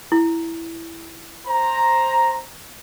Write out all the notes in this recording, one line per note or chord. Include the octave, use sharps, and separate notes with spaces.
E4
C5 A#5